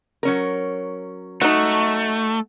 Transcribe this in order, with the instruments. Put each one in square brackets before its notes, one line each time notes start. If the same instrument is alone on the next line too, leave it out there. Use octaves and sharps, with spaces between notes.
[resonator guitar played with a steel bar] F#3 C#4 A#4
[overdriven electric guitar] A3 [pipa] D#4 F#4